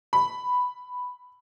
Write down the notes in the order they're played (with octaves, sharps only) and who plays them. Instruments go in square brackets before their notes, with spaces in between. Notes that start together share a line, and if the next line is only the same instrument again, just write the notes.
[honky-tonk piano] B5